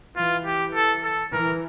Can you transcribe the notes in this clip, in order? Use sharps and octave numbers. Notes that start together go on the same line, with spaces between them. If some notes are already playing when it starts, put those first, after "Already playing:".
E3 F4
G4
A4
A4
E3 A#4